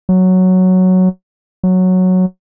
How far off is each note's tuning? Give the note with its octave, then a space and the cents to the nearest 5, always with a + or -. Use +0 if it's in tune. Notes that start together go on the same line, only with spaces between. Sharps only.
F#3 +0
F#3 -5